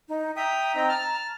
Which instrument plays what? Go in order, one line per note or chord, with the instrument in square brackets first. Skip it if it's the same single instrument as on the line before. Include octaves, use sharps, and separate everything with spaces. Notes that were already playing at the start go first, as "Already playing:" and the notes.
[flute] D#4
[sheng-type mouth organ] E5 G5 D#6 [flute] A#5
[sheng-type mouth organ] C4 D#4 G5
A5 F6